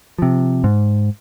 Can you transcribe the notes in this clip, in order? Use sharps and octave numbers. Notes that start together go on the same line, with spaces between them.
C3 F3
G#2